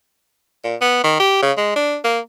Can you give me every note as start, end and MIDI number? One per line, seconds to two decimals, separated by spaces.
0.64 0.76 46
0.81 1.03 59
1.04 1.16 51
1.20 1.40 67
1.42 1.52 49
1.57 1.71 56
1.76 1.97 62
2.04 2.19 58